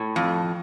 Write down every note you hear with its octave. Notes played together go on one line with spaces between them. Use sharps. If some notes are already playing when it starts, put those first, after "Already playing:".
Already playing: A2
F2